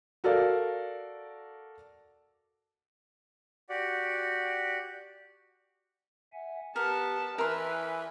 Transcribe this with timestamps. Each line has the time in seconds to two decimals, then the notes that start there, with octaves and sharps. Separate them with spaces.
0.24 F#4 A4 A#4 D5 F5
3.69 F#4 G4 D5 F#5
6.33 E5 F#5 G#5
6.76 B3 G4 A#4 F#5 A5
7.38 E3 A#4 B4 G#5 C6 E6 F#6